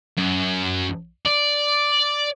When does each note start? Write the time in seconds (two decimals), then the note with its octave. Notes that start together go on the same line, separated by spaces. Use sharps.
0.17 F#2
1.25 D5